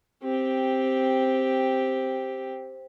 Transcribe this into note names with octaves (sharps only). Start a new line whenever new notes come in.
C4 G4